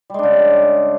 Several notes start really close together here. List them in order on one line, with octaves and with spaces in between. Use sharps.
G3 G#3 D4 C#3